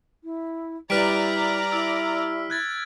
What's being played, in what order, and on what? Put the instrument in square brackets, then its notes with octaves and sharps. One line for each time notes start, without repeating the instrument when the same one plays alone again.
[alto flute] E4
[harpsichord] G3 B4 [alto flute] E4 [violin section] D5 A#5 [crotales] F6 B6 D7
[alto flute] E4 [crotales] E6
[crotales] F#6 G#6 A6